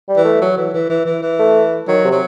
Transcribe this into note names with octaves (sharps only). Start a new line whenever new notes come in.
G3
E3
A3
F#3
E3
E3
E3
E3
E3
A3
D#3 F#3
C3
F#3